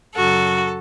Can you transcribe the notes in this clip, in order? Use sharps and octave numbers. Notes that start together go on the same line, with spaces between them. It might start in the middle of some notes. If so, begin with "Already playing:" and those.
F#2 C#3 F#3 F#4 A4